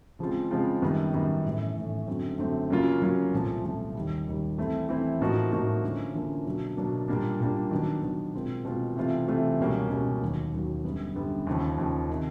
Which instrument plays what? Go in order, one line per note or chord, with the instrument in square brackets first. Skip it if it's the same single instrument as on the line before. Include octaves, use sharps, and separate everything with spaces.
[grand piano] C#3 F3 G#3 C4 F4
C#3 F3 G#3 C4 F4
F#2 D#3 G3 B3
F#2 D#3 G3 B3
A2 E3 A3 C#4
A2 E3 A3 C#4
F#2 D3 F#3 A3 C4
F#2 D3 F#3 A3 C4
C#3 F#3 A#3 C#4 F4
C#3 F#3 A#3 C#4 F4
C2 A#2 F3 A3
C2 A#2 F3 A3
D#2 D#3 G3
D#2 D#3 G3
E3 A3 C4 E4
E3 A3 C4 E4
A2 F3 A#3 D#4 F#4
A2 F3 A#3 D#4 F#4
D3 F3 A#3 C#4
D3 F3 A#3 C#4
B2 F#3 A#3 D4
B2 F#3 A#3 D4
A#2 G3 A#3 D4
A#2 G3 A#3 D4
D#3 F#3 B3 D4
D#3 F#3 B3 D4
B2 G#3 C4 F4 A#4
B2 G#3 C4 F4 A#4
C3 E3 A3 C4 F4
C3 E3 A3 C4 F4
C#2 B2 G3 A#3 C#4
C#2 B2 G3 A#3 C#4
D#2 D#3 F#3
D#2 D#3 F#3
F#2 D3 G3 B3
F#2 D3 G3 B3
D#2 C#3 F3
D#2 C#3 F3
C3 D#3